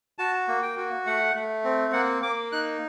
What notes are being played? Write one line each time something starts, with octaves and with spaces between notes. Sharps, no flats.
F#4 A5
A#3
G5
F#4
A3 F#5
A3
C4
A#3 F#5
A#3 D6
D#4 F#6